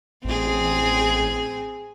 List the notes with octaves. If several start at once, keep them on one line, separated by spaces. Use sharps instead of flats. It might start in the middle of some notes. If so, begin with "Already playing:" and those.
A1 C4 G#4